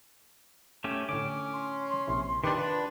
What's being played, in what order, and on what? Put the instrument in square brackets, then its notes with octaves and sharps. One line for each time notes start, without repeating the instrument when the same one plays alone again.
[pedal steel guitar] A3 C#4 G4
[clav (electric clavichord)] A2 D3 [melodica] C#4 [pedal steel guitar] D6
[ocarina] C6
[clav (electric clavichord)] A#1 C3 E4
[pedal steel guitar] D#3 D4 [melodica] G4 B4
[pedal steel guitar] D4 [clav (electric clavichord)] F4 [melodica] B4